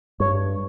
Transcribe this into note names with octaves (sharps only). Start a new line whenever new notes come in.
G2 C#5